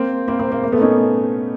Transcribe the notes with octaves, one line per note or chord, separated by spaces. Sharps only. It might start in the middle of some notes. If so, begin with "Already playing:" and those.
Already playing: A#3 C4
A#3 C4
A#3 C4
A#3
A#3
A3 B3
C#4 D#4